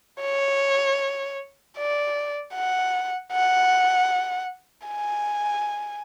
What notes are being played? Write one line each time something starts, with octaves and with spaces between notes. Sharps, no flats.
C#5
D5
F#5
F#5
G#5